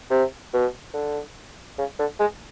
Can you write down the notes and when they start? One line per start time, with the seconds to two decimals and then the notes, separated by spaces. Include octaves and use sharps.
0.10 C3
0.53 B2
0.94 D3
1.78 C#3
1.99 D3
2.20 G#3